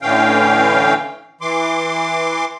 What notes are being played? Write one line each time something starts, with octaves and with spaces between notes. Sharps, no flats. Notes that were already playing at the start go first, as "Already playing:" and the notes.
A2 D3 E3 C#4 F5 G5
E3 C6 D6